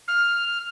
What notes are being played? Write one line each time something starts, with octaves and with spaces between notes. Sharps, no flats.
F6